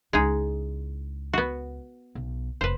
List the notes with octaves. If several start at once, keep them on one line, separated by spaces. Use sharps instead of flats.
C#2 G#3 D#4 E4 G#4
B3 F#4
B1
F1 B4 C5